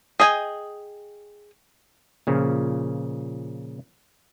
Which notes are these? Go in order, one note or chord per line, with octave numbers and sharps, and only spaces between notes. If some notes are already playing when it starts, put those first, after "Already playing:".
G#4 D#5 G5 G#5
A#2 C#3 F3